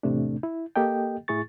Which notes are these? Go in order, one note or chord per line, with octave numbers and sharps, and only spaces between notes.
E2 A2 C3 A3 D4
E4
A#3 G4 A4 D#5 G5
A2 E4 G#4 C#6 A6